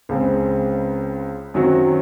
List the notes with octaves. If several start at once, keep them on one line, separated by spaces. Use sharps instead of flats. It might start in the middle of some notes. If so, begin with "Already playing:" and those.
C#2 C#3 G#3 C4
F#2 D#3 F#3 C4 F#4